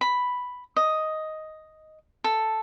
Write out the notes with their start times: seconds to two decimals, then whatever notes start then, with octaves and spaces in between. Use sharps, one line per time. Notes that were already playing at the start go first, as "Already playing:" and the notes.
0.01 B5
0.76 D#5
2.24 A4